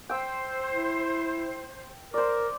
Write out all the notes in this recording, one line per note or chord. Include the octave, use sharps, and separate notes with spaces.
C5 G5 E6
E4
A#4 C5 D5